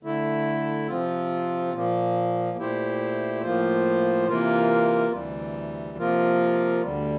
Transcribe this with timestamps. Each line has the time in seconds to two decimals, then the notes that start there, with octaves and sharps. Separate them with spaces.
0.03 D3 A3 E4
0.89 C3 F3 C4 F4
1.73 A#2 F3 A#3
2.57 A#2 A3 E4 G4 C5
3.43 A2 F3 A#3 F4 C5
4.28 C3 E3 A#3 F4 A#4
5.12 D2 C3 E3 G3
5.98 C3 F3 A#3 F4 A#4
6.82 D2 D3 G3